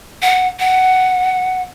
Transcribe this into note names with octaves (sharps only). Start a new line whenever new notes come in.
F#5
F#5